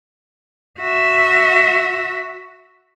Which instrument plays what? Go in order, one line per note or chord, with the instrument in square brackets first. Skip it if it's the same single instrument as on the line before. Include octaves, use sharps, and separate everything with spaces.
[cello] F#4 E5